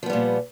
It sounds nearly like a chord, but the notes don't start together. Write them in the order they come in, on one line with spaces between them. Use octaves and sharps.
F3 B3 G3 A#2